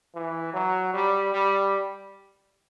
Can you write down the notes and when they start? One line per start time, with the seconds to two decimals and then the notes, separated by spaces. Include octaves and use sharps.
0.15 E3
0.54 F#3
0.94 G3
1.33 G3